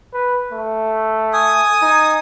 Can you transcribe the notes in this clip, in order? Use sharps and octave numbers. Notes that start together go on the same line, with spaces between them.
B4
A3
G#5 D#6
D#4